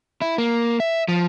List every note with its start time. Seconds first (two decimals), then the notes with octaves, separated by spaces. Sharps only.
0.22 E4
0.38 A#3
0.80 E5
1.08 F3